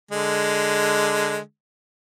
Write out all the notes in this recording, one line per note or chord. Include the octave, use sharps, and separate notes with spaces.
D3 G#3